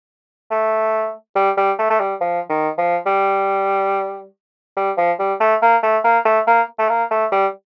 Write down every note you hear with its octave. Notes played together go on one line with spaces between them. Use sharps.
A3
G3
G3
A3
A3
G3
F3
D#3
F3
G3
G3
F3
G3
A3
A#3
A3
A#3
A3
A#3
A3
A#3
A3
G3